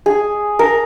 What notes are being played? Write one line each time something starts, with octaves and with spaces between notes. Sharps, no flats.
G#4
A#4